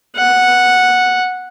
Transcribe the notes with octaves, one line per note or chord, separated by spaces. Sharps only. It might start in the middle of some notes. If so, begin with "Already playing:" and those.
F#5